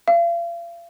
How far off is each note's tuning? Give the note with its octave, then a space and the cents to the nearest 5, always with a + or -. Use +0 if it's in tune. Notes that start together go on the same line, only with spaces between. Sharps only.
F5 -40